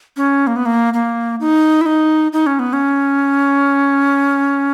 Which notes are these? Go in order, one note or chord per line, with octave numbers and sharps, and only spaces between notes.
C#4
A#3
B3
A#3
A#3
D#4
E4
D#4
D#4
C#4
B3
C#4